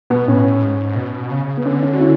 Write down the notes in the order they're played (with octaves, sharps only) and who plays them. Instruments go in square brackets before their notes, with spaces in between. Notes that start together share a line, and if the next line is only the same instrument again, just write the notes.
[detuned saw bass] B2 [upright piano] B3
[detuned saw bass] A2 [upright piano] C#4
[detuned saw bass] G#2
B2
C#3
[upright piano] B3
[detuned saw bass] D3 [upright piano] C#4
[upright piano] C#4
F#4
C#4 E4